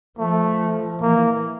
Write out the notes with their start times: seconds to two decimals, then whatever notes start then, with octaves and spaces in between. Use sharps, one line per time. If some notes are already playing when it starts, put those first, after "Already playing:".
0.19 F3 A3
1.01 E3 A#3